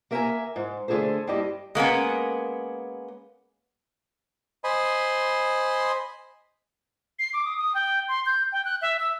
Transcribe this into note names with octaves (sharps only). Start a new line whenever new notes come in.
A#3 A#4 E5 G5 G#5 A#5
G#2
D3 A3 G#4 A4 C5
G2 C4 E4 G4 D#5
G#3 A#3 B3 C#4
C5 D#5 G#5 B5 C6
C7
D6
D#6
D#6
G5
C6
G6
G5
F#6
E5
E6